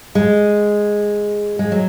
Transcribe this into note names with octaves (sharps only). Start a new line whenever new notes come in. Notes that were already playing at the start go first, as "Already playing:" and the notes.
G#3
G#3
F#3